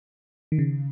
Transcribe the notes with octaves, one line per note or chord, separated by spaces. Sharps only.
D#3
C#3